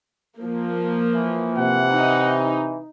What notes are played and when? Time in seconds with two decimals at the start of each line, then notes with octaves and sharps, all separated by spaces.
0.39 F3 A#3
1.12 E3
1.58 C3 F#5
1.92 D#4